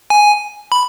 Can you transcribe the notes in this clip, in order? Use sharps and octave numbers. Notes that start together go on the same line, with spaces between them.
G#5
B5